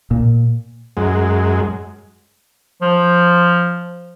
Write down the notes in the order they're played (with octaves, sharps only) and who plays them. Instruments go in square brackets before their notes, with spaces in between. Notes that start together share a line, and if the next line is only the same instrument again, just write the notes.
[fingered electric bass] A#2
[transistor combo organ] F#2 G#3
[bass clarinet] F3